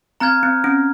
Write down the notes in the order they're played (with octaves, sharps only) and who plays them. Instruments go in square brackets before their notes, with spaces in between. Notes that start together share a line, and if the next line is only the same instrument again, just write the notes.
[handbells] C4 [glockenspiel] A#5 F6 G#6
[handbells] C4
C#4